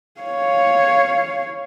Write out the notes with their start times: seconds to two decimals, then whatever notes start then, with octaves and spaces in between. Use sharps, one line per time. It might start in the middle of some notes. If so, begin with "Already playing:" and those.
0.21 C#5 F5